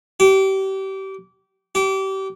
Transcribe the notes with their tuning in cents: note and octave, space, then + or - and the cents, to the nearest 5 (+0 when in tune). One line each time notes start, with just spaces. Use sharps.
G4 -30
G4 -30